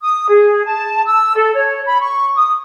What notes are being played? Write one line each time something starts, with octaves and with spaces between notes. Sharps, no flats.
D#6
G#4
A5
E6
A4
C#5
B5
C#6
D#6